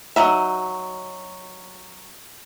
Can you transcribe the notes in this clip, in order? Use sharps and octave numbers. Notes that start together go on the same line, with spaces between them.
F#3 D#4 E5